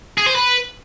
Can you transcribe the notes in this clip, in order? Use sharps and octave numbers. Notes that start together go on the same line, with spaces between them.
G#4
C5
B4